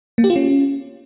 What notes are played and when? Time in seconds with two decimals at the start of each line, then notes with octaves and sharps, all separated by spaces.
0.18 A#3
0.24 G4
0.30 F4
0.36 C#4